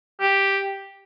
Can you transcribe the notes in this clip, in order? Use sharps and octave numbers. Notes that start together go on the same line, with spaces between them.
G4